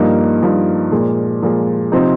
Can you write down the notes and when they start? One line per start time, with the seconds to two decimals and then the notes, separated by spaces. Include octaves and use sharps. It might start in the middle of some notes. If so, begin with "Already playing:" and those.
Already playing: G2 F3 A#3 D#4
0.42 G2 F3 A#3 D#4
0.92 A#2 F3 G#3
1.42 A#2 F3 G#3
1.92 C3 F3 C4 D#4